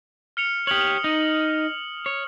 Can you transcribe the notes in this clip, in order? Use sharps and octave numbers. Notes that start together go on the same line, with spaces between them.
F6 C#7 F7
G4 C#5 D#6 F6 F#7
D#4
C#5